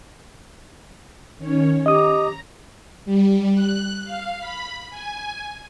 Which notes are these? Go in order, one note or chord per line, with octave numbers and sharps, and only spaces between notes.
D#3 C#4 C#5
G4 D#5 A#5 D#6
G3
F#6
F5
B5
G#5